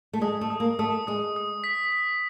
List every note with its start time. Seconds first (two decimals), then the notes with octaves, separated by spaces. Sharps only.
0.13 A3
0.21 G#3 D#6
0.41 A3
0.50 D#6
0.60 A#3
0.79 A3 D#6
1.07 G#3 D#6
1.36 D#6
1.64 B6
1.93 B6